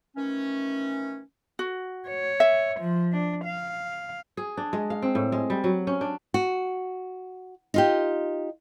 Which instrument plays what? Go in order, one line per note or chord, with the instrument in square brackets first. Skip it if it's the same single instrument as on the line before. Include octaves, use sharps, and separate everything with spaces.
[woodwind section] D#3 E3 A3 C#4
[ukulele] F#4
[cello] C#5
[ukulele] E5
[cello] F3
D4
F5
[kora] G#4
D4
G#3
F5
C4
A2
G#3
G3
F#3
C#4
D4
[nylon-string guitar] F#4
D#4 F4 G4